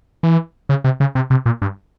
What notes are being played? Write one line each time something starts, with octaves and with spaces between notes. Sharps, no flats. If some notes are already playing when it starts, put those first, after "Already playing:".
E3
C#3
C3
C#3
C3
C3
A#2
G2